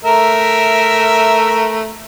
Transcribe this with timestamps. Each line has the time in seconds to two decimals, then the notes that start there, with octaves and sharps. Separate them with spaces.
0.05 A3 A#4 E5